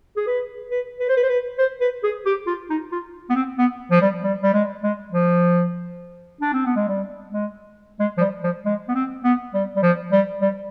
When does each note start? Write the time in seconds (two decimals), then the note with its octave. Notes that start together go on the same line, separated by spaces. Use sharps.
0.17 G#4
0.27 B4
0.71 B4
1.00 B4
1.09 C5
1.17 B4
1.23 C5
1.29 B4
1.58 C5
1.80 B4
2.03 G#4
2.26 G4
2.47 F4
2.70 D#4
2.92 F4
3.29 B3
3.35 C4
3.58 B3
3.91 F3
4.01 G3
4.23 G3
4.43 G3
4.54 G#3
4.83 G#3
5.12 F3
6.41 D4
6.53 C4
6.65 B3
6.76 G#3
6.88 G3
7.33 G#3
8.00 G#3
8.17 F3
8.21 G3
8.43 F3
8.65 G#3
8.88 B3
8.95 C4
9.24 B3
9.54 G3
9.76 G3
9.82 F3
10.12 G3
10.42 G3